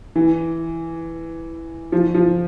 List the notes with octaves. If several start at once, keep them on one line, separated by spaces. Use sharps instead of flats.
E3
F3
F3